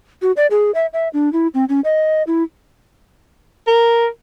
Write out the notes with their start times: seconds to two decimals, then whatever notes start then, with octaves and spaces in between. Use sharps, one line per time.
0.22 F#4
0.37 D5
0.51 G#4
0.75 E5
0.93 E5
1.13 D4
1.33 E4
1.54 C4
1.69 C#4
1.84 D#5
2.27 E4
3.68 A#4